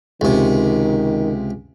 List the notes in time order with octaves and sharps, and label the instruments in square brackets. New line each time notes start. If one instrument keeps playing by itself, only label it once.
[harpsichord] C#2 C3 [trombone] D#3